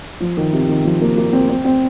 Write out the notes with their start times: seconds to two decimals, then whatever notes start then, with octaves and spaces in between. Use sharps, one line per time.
0.20 F3
0.37 D#3
0.53 C3
0.69 D#3
0.85 F3
1.01 A#3
1.17 A#3
1.33 C4
1.49 C4
1.65 C4